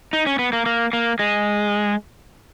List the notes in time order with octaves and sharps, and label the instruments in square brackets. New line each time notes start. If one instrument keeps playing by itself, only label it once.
[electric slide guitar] D#4
C#4
B3
A#3
A#3
A#3
G#3